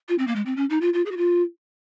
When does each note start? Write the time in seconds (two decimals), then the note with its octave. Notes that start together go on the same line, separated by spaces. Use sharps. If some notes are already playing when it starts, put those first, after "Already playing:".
0.08 F4
0.18 C4
0.27 A#3
0.35 G#3
0.46 C4
0.56 C#4
0.70 D#4
0.81 F4
0.93 F4
1.05 G#4
1.11 F#4
1.17 F4